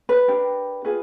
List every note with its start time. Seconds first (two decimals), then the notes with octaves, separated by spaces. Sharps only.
0.09 B4
0.28 D4 G4 A#4
0.85 F4 G#4 B4